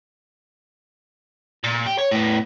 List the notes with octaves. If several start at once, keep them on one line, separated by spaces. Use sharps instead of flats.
A#2
G4
C#5
A2 B3